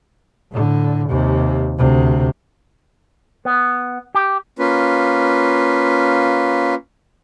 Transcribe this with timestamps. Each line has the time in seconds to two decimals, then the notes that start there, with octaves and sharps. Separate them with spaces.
0.52 A2 D3
1.09 D#2 C3
1.78 D2 C3
3.45 B3
4.15 G4
4.59 A#3 C#4 F4 B4